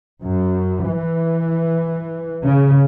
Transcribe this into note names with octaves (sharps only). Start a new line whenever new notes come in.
F#2
E3
C#3